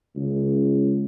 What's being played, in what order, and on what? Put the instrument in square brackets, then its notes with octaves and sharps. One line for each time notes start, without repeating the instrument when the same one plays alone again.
[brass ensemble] C#2